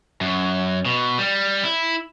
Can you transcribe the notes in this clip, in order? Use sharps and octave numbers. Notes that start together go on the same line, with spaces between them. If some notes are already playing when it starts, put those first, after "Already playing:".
F#2
B2
G3
E4